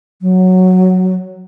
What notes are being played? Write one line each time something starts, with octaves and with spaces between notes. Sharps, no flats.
F#3